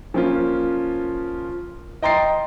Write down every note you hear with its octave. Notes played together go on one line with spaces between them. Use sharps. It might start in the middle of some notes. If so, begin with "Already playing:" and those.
F3 A#3 C#4 F4
D#5 G5 A#5 C6 A6 C7